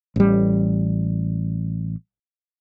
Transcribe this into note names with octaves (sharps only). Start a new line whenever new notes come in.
A1 G3